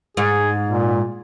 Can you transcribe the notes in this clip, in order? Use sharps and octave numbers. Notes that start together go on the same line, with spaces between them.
G#2 G#4
A#2